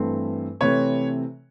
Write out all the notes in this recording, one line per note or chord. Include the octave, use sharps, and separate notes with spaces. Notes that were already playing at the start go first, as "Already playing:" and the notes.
Already playing: G2 E3 A3 C4
C3 E3 A3 C4 B4 C#5